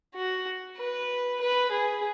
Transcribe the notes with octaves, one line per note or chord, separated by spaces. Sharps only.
F#4
B4
B4
G#4